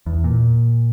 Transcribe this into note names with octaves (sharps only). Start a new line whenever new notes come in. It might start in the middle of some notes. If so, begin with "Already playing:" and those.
E2
A#2